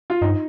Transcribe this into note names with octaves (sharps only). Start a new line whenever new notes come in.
F4
G2 D#4